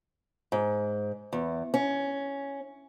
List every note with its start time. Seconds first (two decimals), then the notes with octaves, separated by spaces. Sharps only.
0.52 G#2
1.33 E2
1.74 C#4